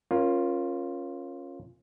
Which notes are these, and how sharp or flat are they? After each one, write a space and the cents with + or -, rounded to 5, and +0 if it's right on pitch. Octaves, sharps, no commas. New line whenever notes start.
C#4 -20 F4 +0 A#4 +15